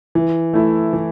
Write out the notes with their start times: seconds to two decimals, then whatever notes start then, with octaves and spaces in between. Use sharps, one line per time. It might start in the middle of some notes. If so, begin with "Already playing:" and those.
0.15 E3
0.54 A3 E4
0.93 E3